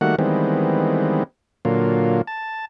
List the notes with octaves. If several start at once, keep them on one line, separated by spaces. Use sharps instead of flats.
D#3 G3 A3 A#3 F#4 F#5
D#3 E3 G3 G#3 B3 C4
A#2 D3 F#3 A#3 F4
A5